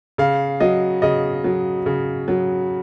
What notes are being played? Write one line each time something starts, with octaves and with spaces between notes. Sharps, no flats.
C#3 F5
F#3 D#5
C#3 D#5
F#3
C#3
F#3